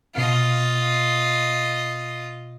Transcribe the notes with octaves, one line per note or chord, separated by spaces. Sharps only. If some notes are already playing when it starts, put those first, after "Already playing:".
B2 F4 D#5 F5